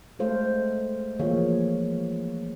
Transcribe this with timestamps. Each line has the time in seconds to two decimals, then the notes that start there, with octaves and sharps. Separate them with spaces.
0.19 G#3 A3 A4 C5 F5
1.19 E3 F3 A#3 G#4 C#5 F5